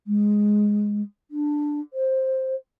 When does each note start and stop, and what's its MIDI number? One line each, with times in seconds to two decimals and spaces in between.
0.07 1.02 56
1.31 1.80 62
1.94 2.55 72